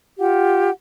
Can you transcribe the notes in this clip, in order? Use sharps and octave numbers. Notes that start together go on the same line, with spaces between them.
F4 G4 F#5